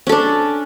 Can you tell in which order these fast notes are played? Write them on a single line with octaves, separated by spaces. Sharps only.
C#4 A4 D4